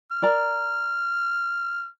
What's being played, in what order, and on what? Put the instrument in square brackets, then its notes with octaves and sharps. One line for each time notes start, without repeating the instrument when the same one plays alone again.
[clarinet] F6
[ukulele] A#4 D5 A#5